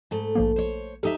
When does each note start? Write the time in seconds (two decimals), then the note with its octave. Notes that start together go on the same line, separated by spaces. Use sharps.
0.11 G#2 A3
0.35 A#1 F3 A#3
0.56 C5 C#5
1.03 D2 D#4 G4 A4 E5